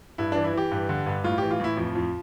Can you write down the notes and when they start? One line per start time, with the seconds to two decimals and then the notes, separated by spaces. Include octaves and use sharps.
0.18 G2 E4
0.32 E3 D4
0.44 E4
0.53 E3 G4
0.71 G2
0.89 D3
1.06 G2
1.24 A2 F4
1.38 E3 G4
1.51 F4
1.60 A2 E4
1.77 F2 F3
1.95 F2